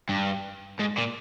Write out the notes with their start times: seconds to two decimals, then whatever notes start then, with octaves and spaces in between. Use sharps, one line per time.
0.09 G2
0.79 G#2
0.97 A#2